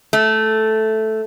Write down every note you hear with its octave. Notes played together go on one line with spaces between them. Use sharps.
A3